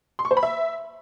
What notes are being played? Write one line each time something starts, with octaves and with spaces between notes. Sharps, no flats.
C6
C#6
C5
B5
E5